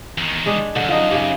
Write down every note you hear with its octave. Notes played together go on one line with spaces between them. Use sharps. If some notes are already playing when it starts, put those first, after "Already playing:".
E2 D#3
G#3 D4 G#4
B1 F#2 D3
F3 D#4 D#5
F#2 C#3 G4